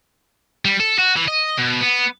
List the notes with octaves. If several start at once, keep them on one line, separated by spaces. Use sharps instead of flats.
G3
A4
F#4
E3
D#5
B2
B3